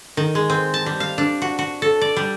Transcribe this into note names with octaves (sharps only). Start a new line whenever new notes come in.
D#3
G#3
C4
A5
G3
F5
D4
F#4
F#4
A4
D5
G3